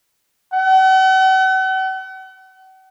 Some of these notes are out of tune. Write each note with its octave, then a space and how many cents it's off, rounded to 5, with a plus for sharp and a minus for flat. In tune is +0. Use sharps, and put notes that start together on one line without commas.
F#5 +40